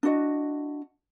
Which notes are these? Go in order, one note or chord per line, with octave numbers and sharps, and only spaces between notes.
D4 E4 F#4 D#5